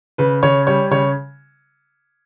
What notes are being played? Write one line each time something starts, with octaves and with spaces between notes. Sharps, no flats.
C#3 B4
C#3 C#5
G3 C#5
C#3 C#5